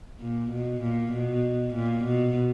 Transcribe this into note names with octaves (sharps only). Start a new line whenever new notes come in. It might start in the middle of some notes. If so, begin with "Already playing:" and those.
A#2
B2
A#2
B2
A#2
B2